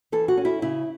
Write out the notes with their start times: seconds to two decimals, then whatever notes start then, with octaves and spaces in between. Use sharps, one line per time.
0.12 E3 A4
0.28 F#4
0.37 C#4
0.45 E4
0.62 C#3 E4